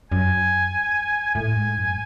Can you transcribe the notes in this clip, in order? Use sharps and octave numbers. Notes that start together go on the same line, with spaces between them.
F#2 G#5
A2 G#5
G#2
F#2